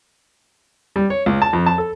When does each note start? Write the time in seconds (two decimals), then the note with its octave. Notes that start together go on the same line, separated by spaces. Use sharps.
0.96 G3
1.10 C#5
1.26 C#2
1.42 A5
1.53 F2
1.66 A5
1.78 A4